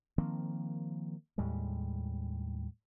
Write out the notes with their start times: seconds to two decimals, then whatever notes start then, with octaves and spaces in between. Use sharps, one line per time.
0.18 D#3 F3 A#3 C4
1.38 D#2 A2 G3 G#3